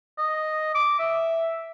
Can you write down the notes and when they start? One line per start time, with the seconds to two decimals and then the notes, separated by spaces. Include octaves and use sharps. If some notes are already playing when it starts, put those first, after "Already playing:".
0.18 D#5
0.75 D6
0.99 E5